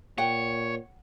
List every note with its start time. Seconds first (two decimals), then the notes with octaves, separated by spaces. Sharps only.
0.18 A#2 C#5 F#5 G5